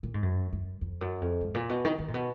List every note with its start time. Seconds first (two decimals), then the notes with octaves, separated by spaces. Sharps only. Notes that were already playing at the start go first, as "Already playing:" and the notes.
0.03 A#2
0.14 G#2
0.23 F#2
0.53 F#2
0.81 F2
1.01 F#2
1.21 F2
1.41 G#2
1.54 A#2
1.69 B2
1.85 D#3
1.98 D#3
2.08 A#2
2.14 B2